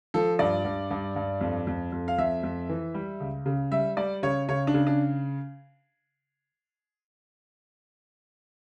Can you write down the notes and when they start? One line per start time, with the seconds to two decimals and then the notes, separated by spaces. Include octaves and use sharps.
0.14 F3 A4
0.39 G2 D5
0.65 G2
0.90 G2
1.16 G2
1.41 F2
1.67 F2
1.92 F2
2.08 F5
2.18 F2 E5
2.43 F2
2.69 E3
2.94 G3
3.20 C#2
3.46 C#3
3.71 G3 E5
3.97 G3 D5
4.23 C#3 C#5
4.49 C#3 C#5
4.67 D4
4.74 C#3
4.87 D4